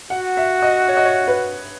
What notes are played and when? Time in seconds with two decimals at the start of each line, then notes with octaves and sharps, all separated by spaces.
0.10 F#4 F#5
0.37 E5
0.62 D#5
0.89 C#5
0.97 D#5
1.05 C#5
1.28 B4